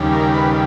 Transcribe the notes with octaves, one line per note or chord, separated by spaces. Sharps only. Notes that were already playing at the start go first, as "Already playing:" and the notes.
Already playing: D#2 C#3 G3
A#4
B4